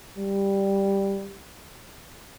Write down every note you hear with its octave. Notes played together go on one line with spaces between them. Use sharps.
G3